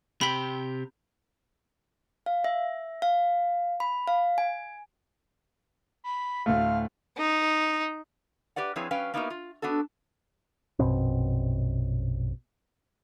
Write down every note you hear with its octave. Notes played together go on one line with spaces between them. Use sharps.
C3 G4 G5 B5 B6
F5
E5
F5
B5
F5
G#5
B5
D2 A2 A3 F5
D#4
G4 B4 D5 F#5
F3 C4 E4 G#4 B4 C#5
F#3 C#4 B4 F5 G5
A#3 B3 D#4 E4 F#4 A#4
F4
B3 D4 F#4 A4
A#1 F#2 B2 C4